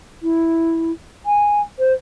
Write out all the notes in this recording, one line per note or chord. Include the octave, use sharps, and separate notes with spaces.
E4
G#5
C5